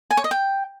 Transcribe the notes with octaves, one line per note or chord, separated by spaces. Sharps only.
G#5
C#5
D#5
G5